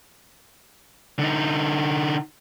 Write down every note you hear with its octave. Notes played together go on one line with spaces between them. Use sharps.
D3 D#4